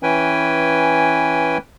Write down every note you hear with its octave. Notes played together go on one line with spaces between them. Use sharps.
E3 C#4 B4 G5 G#5